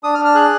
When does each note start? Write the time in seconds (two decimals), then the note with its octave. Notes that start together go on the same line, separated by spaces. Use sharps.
0.03 D4 D#6
0.15 F6
0.19 D4
0.25 F6
0.34 G#4 F#6